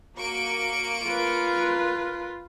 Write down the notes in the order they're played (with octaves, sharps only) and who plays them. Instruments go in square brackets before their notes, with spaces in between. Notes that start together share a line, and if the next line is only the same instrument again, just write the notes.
[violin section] A#3 C#6 D7 [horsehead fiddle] F#4
[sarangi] F4 [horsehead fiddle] A#4 B4